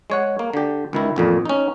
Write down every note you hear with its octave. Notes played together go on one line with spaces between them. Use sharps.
G#3 C#5 F#5
A#3
D3 G4
C#2 D#3 E4
A1 F2 A#2
C#4 D#4